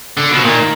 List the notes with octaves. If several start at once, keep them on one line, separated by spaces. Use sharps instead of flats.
D3
B2 F3
A#2 D#3